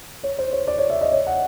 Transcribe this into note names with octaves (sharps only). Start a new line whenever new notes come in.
C#5
C5
C#5
D5
C#5
E5
D#5
C#5
F#5